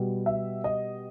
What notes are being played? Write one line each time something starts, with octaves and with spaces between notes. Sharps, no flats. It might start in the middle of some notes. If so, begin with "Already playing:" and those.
Already playing: B2 G3
E5
D#5